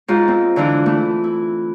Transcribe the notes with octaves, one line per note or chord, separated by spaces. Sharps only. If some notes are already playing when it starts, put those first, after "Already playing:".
G#2 F4
C4
D3 E3 E4 F4
A3 E4
E4